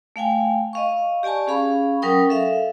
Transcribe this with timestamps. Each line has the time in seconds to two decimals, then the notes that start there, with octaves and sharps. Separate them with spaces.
0.16 A3 F5 G5 G#5
0.73 D#5 F5 C#6
1.23 G4 D5 G#5 A5 C#6
1.47 C#4 G#4 F5 B5 C#6
2.02 F#3 C#4 A#4 G5 D#6
2.29 A4 E5 F5